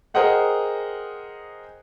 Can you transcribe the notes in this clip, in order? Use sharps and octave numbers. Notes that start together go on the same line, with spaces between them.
G#4 A#4 C5 D#5 F#5 G5